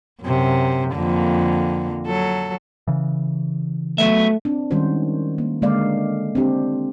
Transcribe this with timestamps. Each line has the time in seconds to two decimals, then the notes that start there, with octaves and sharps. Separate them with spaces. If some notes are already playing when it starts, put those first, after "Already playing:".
0.23 F#2 C3
0.95 F2 D3 A#3
2.07 F#3 A4
2.88 C#3 E3
3.98 F#3 A3 B3 E5
4.45 C4 D4
4.71 D#3 G3 G#3 C#4 F#4 C5
5.38 A#3
5.62 D3 G#3 A#3 D4 D5 F5
6.35 C4 D4 G4